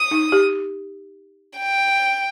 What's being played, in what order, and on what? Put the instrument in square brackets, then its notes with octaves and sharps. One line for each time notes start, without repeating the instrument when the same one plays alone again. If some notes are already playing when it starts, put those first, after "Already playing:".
Already playing: [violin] D#6
[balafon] D#4
G4
[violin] G5